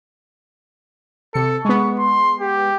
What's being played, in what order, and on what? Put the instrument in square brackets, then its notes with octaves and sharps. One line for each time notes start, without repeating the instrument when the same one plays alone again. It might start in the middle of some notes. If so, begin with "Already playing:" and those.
[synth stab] C3 C#7 [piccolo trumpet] A4
[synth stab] G#3 B3 [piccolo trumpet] C#6
[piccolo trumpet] C6
G4